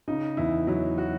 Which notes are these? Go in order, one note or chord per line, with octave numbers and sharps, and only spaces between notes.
C#3 D#4
E2 E4
F#3 E4
F#4